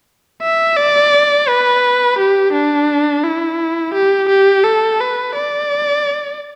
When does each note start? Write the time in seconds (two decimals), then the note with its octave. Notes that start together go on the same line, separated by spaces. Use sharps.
0.42 E5
0.77 D5
1.49 B4
2.18 G4
2.53 D4
3.23 E4
3.94 G4
4.29 G4
4.64 A4
5.00 B4
5.35 D5